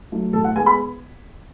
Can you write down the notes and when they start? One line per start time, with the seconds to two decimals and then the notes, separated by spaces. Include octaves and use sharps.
0.12 F#3 A3
0.33 A2 A4
0.44 F#5
0.56 G#3 B3 G#5
0.66 B5